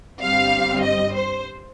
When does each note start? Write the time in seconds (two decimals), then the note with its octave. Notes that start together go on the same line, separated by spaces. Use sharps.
0.22 G1 G2 G3 C4 F5
0.84 D#5
1.15 C5